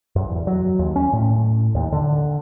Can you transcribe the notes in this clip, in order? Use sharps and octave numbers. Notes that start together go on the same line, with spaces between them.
F#2
E2
F#3
D#2
C#4
A2
D#2
D3